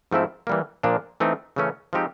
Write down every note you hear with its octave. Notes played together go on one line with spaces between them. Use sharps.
G#2 F3 A3 C4 E4
E3 G3 A#3
A#2 F3 A#3 D4
E3 A3 C4 D#4
C#3 E3 A3 C#4
F3 G#3 C4 D#4 G4